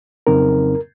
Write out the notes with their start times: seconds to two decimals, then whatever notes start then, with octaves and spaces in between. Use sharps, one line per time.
0.27 F2 C#3 F#3 C4 D#4 A#4